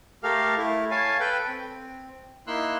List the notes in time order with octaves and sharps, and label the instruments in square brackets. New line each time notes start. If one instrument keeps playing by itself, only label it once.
[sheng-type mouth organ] A3 G4 A4 A#4 F5 F6
A3 E4
C#5 F5 G#5 A5
A4 B4 G5
C4
A#3 D#4 E4 C6 E6 F#6